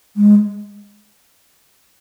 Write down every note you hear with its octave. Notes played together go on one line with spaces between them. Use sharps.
G#3